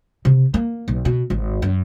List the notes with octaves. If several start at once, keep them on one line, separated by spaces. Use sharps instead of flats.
C3
A#3
B1
B2
G#1
F#2